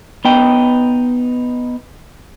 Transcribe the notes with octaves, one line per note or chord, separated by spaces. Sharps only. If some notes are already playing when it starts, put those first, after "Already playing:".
B3 D#4 G5